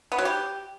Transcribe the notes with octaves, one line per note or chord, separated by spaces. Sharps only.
B3
F#3
G4